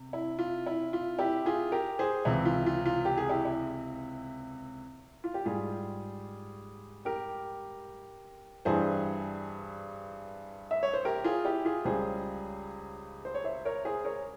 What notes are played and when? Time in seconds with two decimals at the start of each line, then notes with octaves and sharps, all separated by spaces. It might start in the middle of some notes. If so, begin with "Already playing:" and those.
Already playing: C3
0.13 E4
0.39 F4
0.66 E4
0.93 F4
1.19 E4 G4
1.46 F4 G#4
1.72 G4 A#4
1.99 G#4 C5
2.25 C#2 C3 E3 E4
2.45 F4
2.66 F4
2.86 F4
3.05 G4
3.18 G#4
3.29 E4 G4
3.45 E4
5.24 F4
5.34 G4
5.45 G#2 G3 F4 G#4
7.05 G4 A#4
8.65 G2 E3 G3 G#4 C5
10.71 E5
10.83 C#5
10.93 C5
11.05 G4 A#4
11.24 F4 G#4
11.45 E4 G4
11.65 F4 G#4
11.85 C#2 C#3 G3 G#4 C5
13.25 C5
13.35 C#5
13.44 C5 E5
13.65 A#4 C#5
13.85 G#4 C5
14.04 A#4 C#5